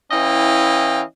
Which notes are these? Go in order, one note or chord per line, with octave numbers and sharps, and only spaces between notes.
E3 C#4 E4 D#5 F5 G5